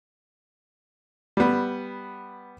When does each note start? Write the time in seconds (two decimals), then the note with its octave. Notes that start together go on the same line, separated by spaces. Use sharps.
1.37 G3 B3